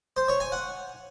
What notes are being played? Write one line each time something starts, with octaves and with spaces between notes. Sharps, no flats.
C5
C#5
G#5
F#5